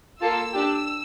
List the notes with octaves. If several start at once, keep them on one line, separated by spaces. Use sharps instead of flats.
A#3 F4 A4 E6
D4 G4